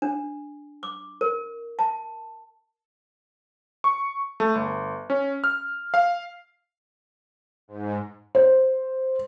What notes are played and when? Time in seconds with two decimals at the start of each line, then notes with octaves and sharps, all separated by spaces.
0.02 D4
0.83 D6
1.21 A#4
1.79 A5
3.84 C#6
4.40 A3
4.55 G1
5.10 C#4
5.44 F6
5.94 F5
7.68 G#2
8.35 C5